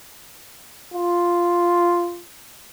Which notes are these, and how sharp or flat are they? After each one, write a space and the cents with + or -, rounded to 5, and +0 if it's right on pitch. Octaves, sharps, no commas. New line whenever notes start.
F4 -5